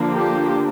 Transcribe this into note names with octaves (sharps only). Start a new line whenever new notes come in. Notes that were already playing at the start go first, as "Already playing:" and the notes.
Already playing: D3 F3 A#3 D4
G4